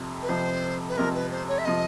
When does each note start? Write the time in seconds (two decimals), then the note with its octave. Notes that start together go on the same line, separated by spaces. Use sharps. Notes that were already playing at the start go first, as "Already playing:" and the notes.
Already playing: F2 C3 F3
0.22 B4
0.29 F2 C3 F3 C5
0.89 B4
0.97 F2 C3 F3 A#4
1.14 B4
1.31 C5
1.48 C#5
1.58 E5
1.65 C3 F3 D#5